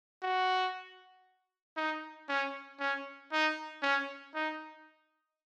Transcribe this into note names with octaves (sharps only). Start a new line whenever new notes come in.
F#4
D#4
C#4
C#4
D#4
C#4
D#4